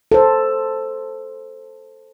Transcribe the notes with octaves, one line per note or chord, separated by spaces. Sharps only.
A4 C5